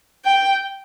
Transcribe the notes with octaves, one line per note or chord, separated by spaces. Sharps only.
G5